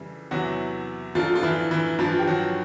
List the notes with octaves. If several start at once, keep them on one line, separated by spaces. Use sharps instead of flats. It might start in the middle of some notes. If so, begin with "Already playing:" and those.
Already playing: F2 C#3 E3 G3
E2 C3 E3 F#3 F#4
F#2 D3 F3 F4
F4
E3 E4
E3 E4
G2 E3 F3 F4
G4
F#3 F#4